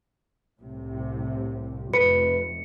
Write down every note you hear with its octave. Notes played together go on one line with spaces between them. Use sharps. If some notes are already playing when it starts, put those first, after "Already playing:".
C2 A2 C3
F1 B4 C#7